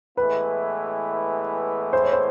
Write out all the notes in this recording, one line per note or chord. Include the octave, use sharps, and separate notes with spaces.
A2 E3 G#3 B3 E4 B4
C5
C#5
C5